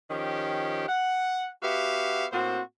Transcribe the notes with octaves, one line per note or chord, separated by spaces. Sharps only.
D#3 F3 C#4 G4
F#5
B3 F#4 G4 E5 F5
A2 A#3 C4 F#4 C5